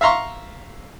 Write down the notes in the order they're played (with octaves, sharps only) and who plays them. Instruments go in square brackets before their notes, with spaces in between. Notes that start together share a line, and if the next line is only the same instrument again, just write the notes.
[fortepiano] E5 F5 A#5 C6 C#6